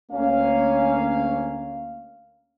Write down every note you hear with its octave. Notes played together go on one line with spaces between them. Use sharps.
D2 A#3 C#4 F5